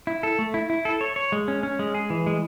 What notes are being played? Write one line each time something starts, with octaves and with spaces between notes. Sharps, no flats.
E4
A4
A3
E4
E4
A4
C#5
C#5
G#3
C#4
C#4
G#3
G#4
E3
G#3